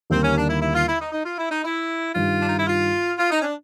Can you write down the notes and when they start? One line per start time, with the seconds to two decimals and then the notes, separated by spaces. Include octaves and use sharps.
0.10 D#2 D3 G3 A#3 C4
0.23 C#4
0.37 D4
0.49 E4
0.61 E4
0.74 F4
0.88 E4
1.01 D#4
1.12 D#4
1.26 F4
1.38 E4
1.51 D#4
1.64 E4
2.15 G2 D#3 G3 F4
2.40 D4
2.48 D#4
2.58 E4
2.67 F4
3.18 F4
3.31 D#4
3.40 C#4
3.43 D4